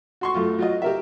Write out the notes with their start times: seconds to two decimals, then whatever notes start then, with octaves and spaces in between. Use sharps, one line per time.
0.21 F#4 C6 C#6
0.34 F#2 A3 F4
0.58 F#3 F4 D#5
0.82 G4 A#4 E5